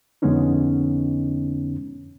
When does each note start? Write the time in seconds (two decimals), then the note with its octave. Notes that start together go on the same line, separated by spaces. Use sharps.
0.22 F2 D3 G#3 B3 C#4 D#4